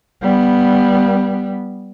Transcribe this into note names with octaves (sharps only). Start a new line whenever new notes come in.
G3 B3